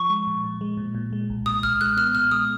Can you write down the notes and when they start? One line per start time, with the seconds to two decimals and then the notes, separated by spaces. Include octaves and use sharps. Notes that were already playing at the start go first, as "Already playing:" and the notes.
Already playing: F3 C#6
0.10 G#3
0.27 A#2
0.44 A#2
0.61 G#3
0.77 A#2
0.95 A#2
1.13 G#3
1.30 B1
1.46 A#2 D#6
1.63 B1 F6
1.81 G#3 F#6
1.97 B3 F6
2.15 A#2 F6
2.31 G#3 D#6